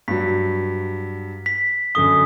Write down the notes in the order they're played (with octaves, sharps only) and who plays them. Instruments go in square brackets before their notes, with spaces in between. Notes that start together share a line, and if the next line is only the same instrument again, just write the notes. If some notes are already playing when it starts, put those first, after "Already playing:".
[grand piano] G2 F#3 [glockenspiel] B6
[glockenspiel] B6
[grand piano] F#2 D3 G7 [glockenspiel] D#6